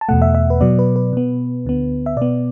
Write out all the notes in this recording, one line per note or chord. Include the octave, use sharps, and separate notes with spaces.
A5
E2 B2 A3 F#5
E5
E5
B4
B2 F#3 B3 D5
B4
B4
B2 B3
D2 D3 B3
E5
B2 B3 D5